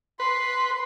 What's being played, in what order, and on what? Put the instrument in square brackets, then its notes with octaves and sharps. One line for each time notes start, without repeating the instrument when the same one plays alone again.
[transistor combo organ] B4 [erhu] C6